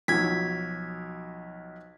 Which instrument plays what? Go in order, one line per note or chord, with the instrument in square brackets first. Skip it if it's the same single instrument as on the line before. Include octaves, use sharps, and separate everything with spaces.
[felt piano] B1 F3 F#3 [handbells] G#6 B6